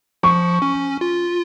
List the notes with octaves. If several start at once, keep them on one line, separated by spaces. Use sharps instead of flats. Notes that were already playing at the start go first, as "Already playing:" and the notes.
F3 C#6
C#4
F4